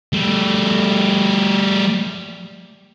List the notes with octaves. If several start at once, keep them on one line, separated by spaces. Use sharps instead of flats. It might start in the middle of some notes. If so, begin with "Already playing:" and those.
G3 A3